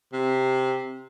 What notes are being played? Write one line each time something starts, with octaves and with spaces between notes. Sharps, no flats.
C3